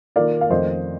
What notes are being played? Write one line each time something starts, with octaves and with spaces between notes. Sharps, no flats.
D#3 A#3 F4 D5 F5
F5
F2 D#3 A3 C5 D#5